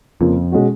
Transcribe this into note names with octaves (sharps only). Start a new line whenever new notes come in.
F2 C#3 F3 A#3
B2 G#3 C#4 F#4